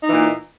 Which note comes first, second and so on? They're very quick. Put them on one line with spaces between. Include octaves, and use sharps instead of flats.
D#4 E3 A#2